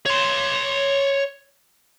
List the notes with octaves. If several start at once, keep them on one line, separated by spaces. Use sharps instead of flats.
C#5 C6